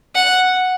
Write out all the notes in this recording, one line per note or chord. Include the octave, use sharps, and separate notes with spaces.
F#5